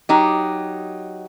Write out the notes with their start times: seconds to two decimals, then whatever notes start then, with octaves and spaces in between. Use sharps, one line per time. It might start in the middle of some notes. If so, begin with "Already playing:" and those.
0.09 F#3 D#4 G4